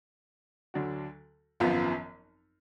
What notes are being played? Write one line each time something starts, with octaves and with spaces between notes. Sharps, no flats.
D2 D3 F#3 D4 F#4
G#1 F#2 F3 B3 F4